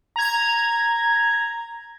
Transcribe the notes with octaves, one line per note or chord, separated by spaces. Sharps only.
A#5 G#6